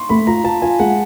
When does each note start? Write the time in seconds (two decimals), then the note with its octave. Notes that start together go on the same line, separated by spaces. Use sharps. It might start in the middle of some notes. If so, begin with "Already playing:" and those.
Already playing: C6 C#6
0.09 A3 B5
0.27 F4 A#5
0.44 F4 A5
0.62 F4 G#5
0.79 G#3 F#5